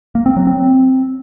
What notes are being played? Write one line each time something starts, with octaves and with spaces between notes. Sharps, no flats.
A#3
C4
F#3
C4